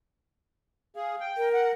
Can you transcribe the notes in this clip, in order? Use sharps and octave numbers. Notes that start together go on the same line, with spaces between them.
G#4 F5
G5
A#4
F#5